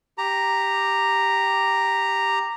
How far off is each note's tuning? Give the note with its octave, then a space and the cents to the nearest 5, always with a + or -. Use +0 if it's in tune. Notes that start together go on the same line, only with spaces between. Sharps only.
G4 +0 A#5 -5